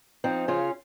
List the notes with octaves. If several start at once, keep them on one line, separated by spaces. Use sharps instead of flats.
F3 C4 D#4
C#3 C#4 F4